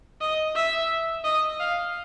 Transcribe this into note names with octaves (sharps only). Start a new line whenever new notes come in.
D#5
E5
D#5
F5